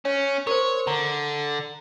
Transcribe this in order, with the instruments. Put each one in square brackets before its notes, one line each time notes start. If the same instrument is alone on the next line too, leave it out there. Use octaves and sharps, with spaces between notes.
[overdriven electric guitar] C#4 [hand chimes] C#5
[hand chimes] A#4 C5 [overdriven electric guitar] C#5
[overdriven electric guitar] D3 [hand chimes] A#5